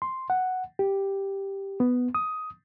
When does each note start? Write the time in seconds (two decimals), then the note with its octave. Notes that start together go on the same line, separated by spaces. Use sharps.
0.02 C6
0.30 F#5
0.79 G4
1.80 B3
2.15 D#6